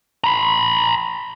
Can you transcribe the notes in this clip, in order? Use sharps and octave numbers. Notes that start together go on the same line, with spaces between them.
A#5 B5